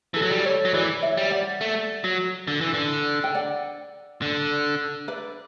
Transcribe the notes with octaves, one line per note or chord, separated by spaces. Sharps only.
E3 A4
F#3
G3
A4 C#5
F#3
E3 B4 D5
C#5 E5
G3
D5 F#5
A3
F#3
D3
E3
D3
G5
D5 F#5
D3
B4 D5